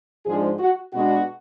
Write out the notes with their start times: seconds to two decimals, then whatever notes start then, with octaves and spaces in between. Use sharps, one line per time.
0.26 G#2 F3 G#3 D4 G#4
0.59 F#4
0.92 B2 G#3 B3 D4 F#4